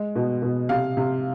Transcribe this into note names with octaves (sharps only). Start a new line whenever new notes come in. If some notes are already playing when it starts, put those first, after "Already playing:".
Already playing: G#3
B2
B2
C3 F5
C3